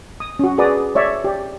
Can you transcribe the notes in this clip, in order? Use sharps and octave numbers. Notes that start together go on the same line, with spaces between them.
D#6
C#4 F#4
F#4 G#4 B4 D5 A#5 D#6
C#5 D5 E5 C#6
G4 D5